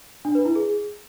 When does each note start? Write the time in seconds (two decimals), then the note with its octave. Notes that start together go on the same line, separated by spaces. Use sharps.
0.25 D4
0.35 B4
0.45 E4
0.55 G#4